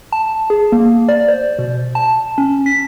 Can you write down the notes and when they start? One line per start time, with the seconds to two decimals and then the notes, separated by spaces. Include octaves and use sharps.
0.12 A5
0.50 G#4
0.72 A#3
1.09 D5
1.28 C5
1.59 B2
1.95 A5
2.38 C#4
2.66 B6